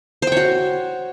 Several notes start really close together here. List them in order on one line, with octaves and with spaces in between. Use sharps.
C5 G5 C#5 F#4